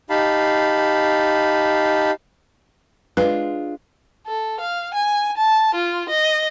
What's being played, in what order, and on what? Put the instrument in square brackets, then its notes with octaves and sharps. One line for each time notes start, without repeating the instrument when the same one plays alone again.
[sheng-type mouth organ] D#4 G4 F5 A5 B5
[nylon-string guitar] G#3 D4 F4 [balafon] B4
[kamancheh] A4
F5
G#5
A5
F4
D#5